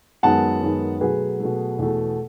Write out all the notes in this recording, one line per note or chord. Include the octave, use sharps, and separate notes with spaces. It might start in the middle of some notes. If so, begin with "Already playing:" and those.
F#2 D#3 G#3 B3 F#5 A5
F#2 D#3 G#3 B3
B2 F#3 A3 G#4 B4
B2 F#3 A3
E2 B2 A3